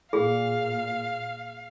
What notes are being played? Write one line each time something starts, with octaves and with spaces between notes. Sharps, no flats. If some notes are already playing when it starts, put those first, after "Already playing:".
A#2 G#4 F5